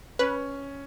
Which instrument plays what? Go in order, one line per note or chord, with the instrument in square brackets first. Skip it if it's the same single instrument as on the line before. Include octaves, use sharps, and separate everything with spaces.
[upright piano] C#4 [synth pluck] B4